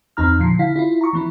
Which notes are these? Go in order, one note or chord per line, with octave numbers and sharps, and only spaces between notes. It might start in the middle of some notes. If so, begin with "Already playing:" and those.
E2 C4 D#4 A#5 F6
A#2 D3 F3 C7
D3 E4 F5 B6
E4 F4
A#5 C#6
E3 B3 E4